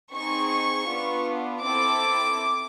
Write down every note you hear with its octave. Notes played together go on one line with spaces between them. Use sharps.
C4 D#4 G#4 C#6
B3 D4 F4
C4 E4 A4 D6